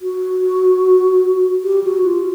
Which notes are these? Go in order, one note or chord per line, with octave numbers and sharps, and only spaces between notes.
F#4
G4
F#4
F4